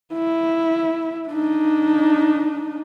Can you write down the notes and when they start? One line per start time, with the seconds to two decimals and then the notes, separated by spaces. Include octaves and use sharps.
0.14 E4
1.29 D4 D#4